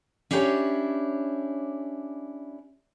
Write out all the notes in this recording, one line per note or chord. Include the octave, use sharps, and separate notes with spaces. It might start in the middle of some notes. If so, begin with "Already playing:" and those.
C#4 D4 E4 G4 C5 C#5